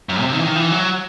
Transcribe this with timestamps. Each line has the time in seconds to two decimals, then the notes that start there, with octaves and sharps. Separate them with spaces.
0.09 F#2
0.21 C3
0.33 D#3
0.39 E3
0.44 D#3
0.56 E3
0.72 F#3